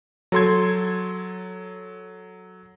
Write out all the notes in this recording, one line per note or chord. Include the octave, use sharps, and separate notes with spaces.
F#3 A4 C6 G#6